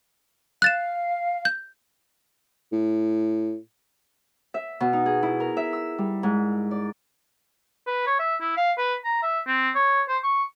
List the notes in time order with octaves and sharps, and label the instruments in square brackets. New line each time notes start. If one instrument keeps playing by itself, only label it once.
[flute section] F5 [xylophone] F#6 A6 E7
[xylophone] G6
[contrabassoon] A2
[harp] E5
B2
D#4
G#4
E4
A#4
E5
E6
G3
G#2
D5
[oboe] B4
C#5
E5
E4
F5
B4
A#5
E5
C4
C#5
C5
C#6